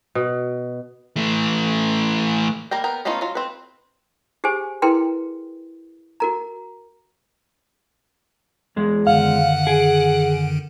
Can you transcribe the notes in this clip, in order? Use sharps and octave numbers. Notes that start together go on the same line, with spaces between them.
B2
E3 A3
G3 A#3 A#4 G5
B3 A#4 G5
A3 B3 C#4 D#4 F4
F#3 F4
C4 B4
G4 G#4 C5 G#5
E4 G#4 A#4 B4 G5 C6
F#4 A#4 A#5
E2 G#3
F#2 D3 D#3 F5 F#5
G#4 D7